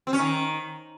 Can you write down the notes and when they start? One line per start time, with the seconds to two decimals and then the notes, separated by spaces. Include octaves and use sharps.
0.07 C4
0.13 C#4
0.19 D#3